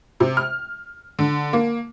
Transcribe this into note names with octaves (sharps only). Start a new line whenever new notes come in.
C3
F6
D3
A#3